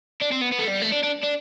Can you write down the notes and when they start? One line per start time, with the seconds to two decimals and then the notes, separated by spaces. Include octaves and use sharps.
0.21 D4
0.32 C4
0.42 B3
0.52 B3
0.59 A3
0.68 G3
0.82 A3
0.93 D4
1.04 D4
1.23 D4